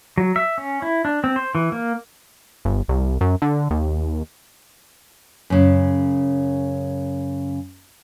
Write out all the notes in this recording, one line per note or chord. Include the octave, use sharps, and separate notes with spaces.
F#3
E5
C#4
E4
D4
C4
C5
E3
A#3
G1
C2
F#2
D3
D#2
F#2 C#3